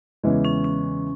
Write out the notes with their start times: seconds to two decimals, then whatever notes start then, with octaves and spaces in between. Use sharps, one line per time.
0.23 E2 C#3 E3 G#3
0.45 C#4
0.64 C#4